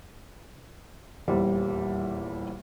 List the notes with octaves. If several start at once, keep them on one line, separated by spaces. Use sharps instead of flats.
D#1 E2 G3 C5